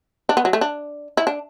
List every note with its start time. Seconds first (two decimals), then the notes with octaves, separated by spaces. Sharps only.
0.29 D4
0.37 B3
0.45 F#3
0.53 A3
0.61 D4
1.17 E4
1.27 D4